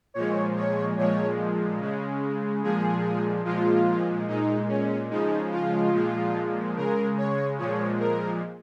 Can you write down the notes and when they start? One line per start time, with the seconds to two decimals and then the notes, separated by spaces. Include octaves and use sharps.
0.14 A#2 F3 G#3 C#5
0.56 C#5
0.97 A#2 F3 G#3 C#5
1.79 C#3 G#3
2.63 A#2 F3 G#3 G#4
3.45 A#2 F3 G#3 F4
4.28 A#2 G#3 D#4
4.69 C#4
5.10 C#3 F3 G#3 D#4
5.52 F4
5.93 A#2 F3 G#3
6.76 C#3 G#3 A#4
7.18 C#5
7.58 A#2 F3 G#3 C#5
8.00 A#4